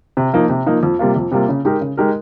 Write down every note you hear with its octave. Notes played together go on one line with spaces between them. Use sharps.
C3
F3 A#3 D#4
C3
F3 A#3 D#4
F2
C3 G3 A#3 F4
F2
C3 G3 A#3 F4
C#3
G#3 D#4 G4 A#4
C#3
G#3 D#4 G4 A#4